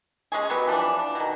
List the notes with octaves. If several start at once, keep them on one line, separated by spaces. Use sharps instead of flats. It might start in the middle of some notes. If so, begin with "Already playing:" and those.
G#3 C#4 G#4
F#3 G3 B3
E3 F3 G3 D4
D4
B2 D#3